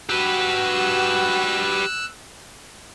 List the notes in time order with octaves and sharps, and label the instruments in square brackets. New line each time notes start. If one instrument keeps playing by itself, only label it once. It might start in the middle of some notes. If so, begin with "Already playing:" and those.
[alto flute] F#4 [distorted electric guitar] G4 B4 [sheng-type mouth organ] E6 F#6